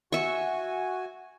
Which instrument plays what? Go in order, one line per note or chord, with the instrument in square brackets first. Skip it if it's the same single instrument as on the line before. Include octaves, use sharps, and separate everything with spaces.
[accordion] F#4 G#5 [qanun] E5 C#6